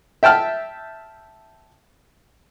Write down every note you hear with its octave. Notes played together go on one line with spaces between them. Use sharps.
E5 G5 A5 F6